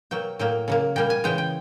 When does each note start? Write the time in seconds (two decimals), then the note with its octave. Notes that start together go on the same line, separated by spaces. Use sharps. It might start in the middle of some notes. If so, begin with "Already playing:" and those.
0.11 B2 F#3 A#3 G5
0.39 A2 F#3 A#3 G5
0.68 C#3 F#3 A#3
0.96 A#2 G3 A#3 G5
1.10 G#5
1.24 C#3 E3 G#3 G5
1.38 G5